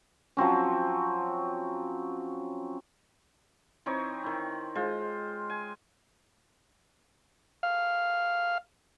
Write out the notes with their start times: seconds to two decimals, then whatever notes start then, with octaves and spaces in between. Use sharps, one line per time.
0.37 F3 F#3 C4 C#4
3.86 E3 C4 D#4 C#5
4.24 D#3 E4
4.75 G#3 F4 C5
5.50 G#5
7.63 F5